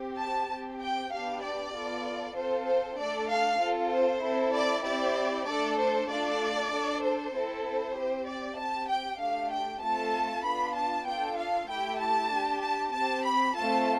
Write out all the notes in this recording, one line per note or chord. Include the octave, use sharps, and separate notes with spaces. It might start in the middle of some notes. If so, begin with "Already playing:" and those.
Already playing: C4 G4
A5
C4 G4
G5
B3 D4 G4 F5
D5
B3 F4 A4
C4 F4 A4 C5
C5
A3 D4 A4 D5
F5
C4 F4 A4
C5
C4 E4 A4
D5
C4 E4 G4 D5
A3 D4 A4 D5
C5
A3 D4 F4 A4 D5
D4 A4
C5
C4 E4 A4
C5
C4 G4
D5
C4 G4 A5
G5
A3 D4 G4 F5
G5
A3 C4 F4 A4 A5
B3 D4 F4 B5
A5
D4 F4 A4 G5
F5
A3 E4 G4 G5
A5
D4 G4
A5
C4 G4 A5
B5
A3 C4 F4 A4 A5